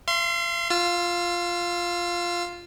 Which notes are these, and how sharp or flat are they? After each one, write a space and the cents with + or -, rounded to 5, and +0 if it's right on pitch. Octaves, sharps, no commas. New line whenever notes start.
F5 -45 C6 +0
F4 +0 E6 +40